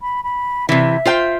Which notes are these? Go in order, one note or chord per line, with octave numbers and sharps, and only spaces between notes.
B5
B5
C3 E3 E5
F4 C5 G5